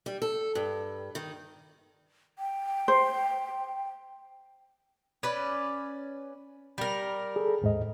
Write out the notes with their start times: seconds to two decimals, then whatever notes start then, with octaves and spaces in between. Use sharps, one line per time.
0.06 G3
0.22 A4
0.55 G2
1.15 D#3
2.39 G5
2.88 C5
5.23 C#4 B4 D5
6.78 G3 A#4
7.36 G#4 A4
7.62 D#2 G#2 D#5